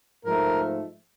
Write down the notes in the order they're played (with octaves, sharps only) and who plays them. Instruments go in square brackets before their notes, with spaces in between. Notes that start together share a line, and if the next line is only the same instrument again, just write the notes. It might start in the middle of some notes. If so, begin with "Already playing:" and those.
[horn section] G#2 F3 A3 A#4